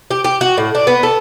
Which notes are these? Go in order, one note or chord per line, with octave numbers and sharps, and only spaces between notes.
G4
G4
F#4
A2
D4
B3
A4